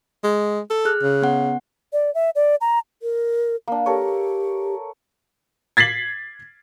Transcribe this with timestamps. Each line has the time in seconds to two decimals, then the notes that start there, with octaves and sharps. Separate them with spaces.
0.24 G#3
0.70 A4
0.85 G#4 F6 F#6
1.03 C#3
1.22 B3 F#5
1.93 D5
2.14 E5
2.35 D5
2.61 A#5
3.02 A#4
3.68 A#3 D4
3.86 G4 A4 A#4 C#5
5.77 G#6 A6 B6 C7 F#7